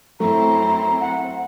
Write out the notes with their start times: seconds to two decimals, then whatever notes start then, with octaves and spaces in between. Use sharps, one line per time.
0.20 F#2 A3 C4 E4 A#5
1.01 F#5